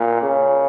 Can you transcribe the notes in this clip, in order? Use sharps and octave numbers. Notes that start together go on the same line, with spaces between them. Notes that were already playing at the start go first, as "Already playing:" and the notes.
Already playing: A#2
C#3